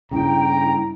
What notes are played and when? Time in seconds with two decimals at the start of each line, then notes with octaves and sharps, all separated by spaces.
0.11 G2 C#3 E4 G5 A#5